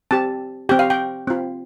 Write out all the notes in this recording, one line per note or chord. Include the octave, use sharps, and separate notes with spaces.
C4 G4 A5
C4 G4 G5
F5
G5
C4 F4